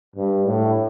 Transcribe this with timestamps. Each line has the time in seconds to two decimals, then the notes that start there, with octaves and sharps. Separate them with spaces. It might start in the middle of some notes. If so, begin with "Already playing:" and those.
0.15 G2
0.46 A2